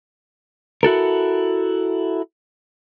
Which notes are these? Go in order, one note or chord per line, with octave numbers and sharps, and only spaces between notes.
E4 F#4 A4 A#4